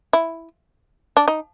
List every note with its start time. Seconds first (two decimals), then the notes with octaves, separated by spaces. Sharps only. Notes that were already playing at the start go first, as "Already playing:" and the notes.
0.13 E4
1.17 D4
1.28 D#4